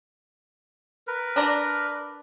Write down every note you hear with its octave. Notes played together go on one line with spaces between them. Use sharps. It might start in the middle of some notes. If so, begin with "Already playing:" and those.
A#4 B4
D4 D5 A#5